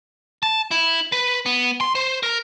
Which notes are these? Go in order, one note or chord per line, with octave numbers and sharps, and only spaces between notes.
A5
E4
B4
B3
C6
C5
A#4